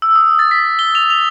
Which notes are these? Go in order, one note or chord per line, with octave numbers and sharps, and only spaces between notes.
E6
D#6
A6
B6
G7
F7
F7